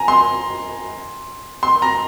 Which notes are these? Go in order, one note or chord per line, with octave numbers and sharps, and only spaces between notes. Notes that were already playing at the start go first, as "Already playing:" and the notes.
Already playing: G#5 A#5
C6
C6
A#5